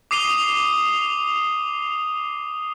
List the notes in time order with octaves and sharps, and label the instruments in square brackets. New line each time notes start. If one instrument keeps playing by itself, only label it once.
[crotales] D6 D#6 C7 D#7 F7 G7